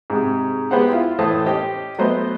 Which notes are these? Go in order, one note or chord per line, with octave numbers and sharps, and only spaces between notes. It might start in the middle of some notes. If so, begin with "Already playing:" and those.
G#2 C3
G#3 B3 G4 C5 F#5
E4 F4
A2 E3 C5 A5 D#6
C#4 G4 C5 D#5
F#3 A3 B3 C5 D#5